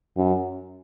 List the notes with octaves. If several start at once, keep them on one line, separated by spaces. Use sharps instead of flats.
F#2